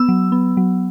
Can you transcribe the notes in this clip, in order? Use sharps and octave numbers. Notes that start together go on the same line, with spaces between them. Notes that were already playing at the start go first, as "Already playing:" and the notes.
Already playing: B3 E6
F#3
B3
F#3